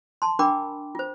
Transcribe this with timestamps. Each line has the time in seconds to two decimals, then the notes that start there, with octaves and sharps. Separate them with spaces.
0.22 A5 C6
0.39 D4 A#4 G5 B5 D6
0.95 F4 C5